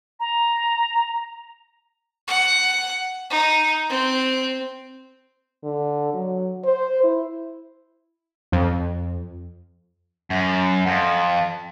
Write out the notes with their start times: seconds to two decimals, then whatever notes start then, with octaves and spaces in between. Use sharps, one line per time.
0.20 A#5
2.27 F#5
3.30 D#4
3.90 C4
5.63 D3
6.14 F#3
6.65 C5
7.03 E4
8.52 F2
10.30 F#2
10.87 F2